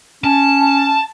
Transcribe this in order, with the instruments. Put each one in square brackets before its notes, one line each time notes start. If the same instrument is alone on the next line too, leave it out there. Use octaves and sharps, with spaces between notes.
[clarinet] C#4 [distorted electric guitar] A5